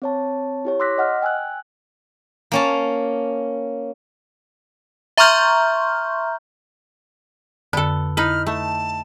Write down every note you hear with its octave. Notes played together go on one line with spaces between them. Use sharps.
C4 C#5 A5
E4 G4 C#5
C6 D6 E6 F#6 A#6 B6
D#5 F#5 F6
G5 G#5 E6 F#6
A#3 C#4 A5
E5 A#5 C6 C#6 F6 G6
F2 D3 B3 A4 D5
D#4 E4 B4 F6
A3 A5